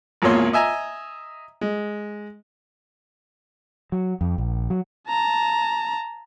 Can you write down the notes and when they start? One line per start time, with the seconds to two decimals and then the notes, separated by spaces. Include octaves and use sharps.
0.22 G#1 E2 A#2 A#3 C#5 C6
0.53 D#5 E5 G#5 A#5
1.61 G#3
3.92 F#3
4.21 F2
4.38 A#1
4.70 F#3
5.09 A5 A#5